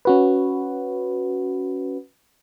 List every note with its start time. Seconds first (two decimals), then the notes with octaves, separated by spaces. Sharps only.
0.05 C#4 F#4 B4